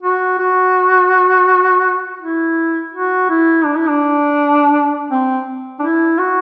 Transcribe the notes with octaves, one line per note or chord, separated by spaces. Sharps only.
F#4
F#4
E4
F#4
E4
D4
E4
D4
C4
D4
E4
F#4